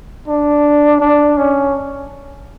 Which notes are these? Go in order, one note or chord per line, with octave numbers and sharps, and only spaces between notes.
D4
D4
C#4